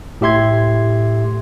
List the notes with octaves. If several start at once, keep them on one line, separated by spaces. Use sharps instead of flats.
A2 G4 E5 C6 G#6